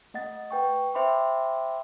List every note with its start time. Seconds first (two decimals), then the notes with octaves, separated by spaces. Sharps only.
0.14 A3 D#5 F#5 A6
0.51 B4 G5 C#6
0.94 C5 E5 G5 B5 C6 D6